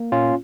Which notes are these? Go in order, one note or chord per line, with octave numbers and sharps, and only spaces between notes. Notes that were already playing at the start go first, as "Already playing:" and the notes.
Already playing: A#3
A#2 C#4 F4